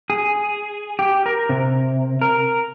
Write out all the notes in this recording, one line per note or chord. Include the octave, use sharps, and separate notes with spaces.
G#4
G4
A#4
C3
A#4